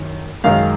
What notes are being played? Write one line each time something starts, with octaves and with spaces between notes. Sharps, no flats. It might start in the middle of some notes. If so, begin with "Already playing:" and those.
Already playing: F#2 D#3
F#2 D#3 G#3 F5